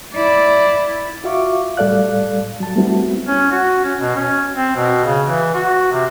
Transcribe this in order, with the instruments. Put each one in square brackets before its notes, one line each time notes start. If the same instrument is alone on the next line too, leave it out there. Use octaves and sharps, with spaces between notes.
[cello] E4 D5
[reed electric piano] F4 F#4 E5 F5 C#6 D6
A2 G3 A4 D5 F5 F#6
F#3 A5
G3 A3 B3 C4 E4 F#4
[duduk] C#4
F#4
C#4
B2
C#4
C4
B2
C#3
E3
F#4
C3